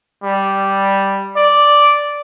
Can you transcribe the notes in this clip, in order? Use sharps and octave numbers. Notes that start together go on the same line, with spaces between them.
G3
D5